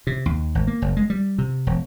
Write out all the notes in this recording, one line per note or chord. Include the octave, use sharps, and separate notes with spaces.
C3
D#2
G#1
A#3
F#1
G#3
G3
C3
E1